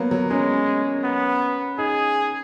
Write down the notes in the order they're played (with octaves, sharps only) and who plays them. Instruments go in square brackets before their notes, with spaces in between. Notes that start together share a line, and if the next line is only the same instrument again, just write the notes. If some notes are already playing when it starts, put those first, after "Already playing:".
Already playing: [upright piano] F#3 A#3 B3
F#3
[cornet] G#3 [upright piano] C#4
[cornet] B3
[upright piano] D#4 [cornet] G#4